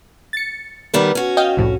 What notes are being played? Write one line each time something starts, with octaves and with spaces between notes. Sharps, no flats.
A6 C#7
D#3 G3 B3
C#4 F#4
D#5 F5 G5
C2 F2 A2